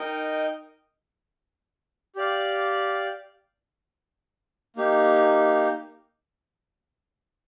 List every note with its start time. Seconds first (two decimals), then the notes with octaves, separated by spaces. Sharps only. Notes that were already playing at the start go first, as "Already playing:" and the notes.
Already playing: D#4 A#4 D#5 G5
2.16 G4 D5 F5
4.76 A#3 D#4 G4